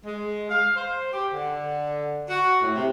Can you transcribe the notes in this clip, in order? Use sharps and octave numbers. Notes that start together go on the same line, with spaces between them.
G#3
F5
C5
G4
D3
F#4
A2
C3